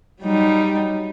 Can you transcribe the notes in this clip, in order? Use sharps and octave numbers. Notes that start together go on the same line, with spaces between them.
F#3 G3 D#4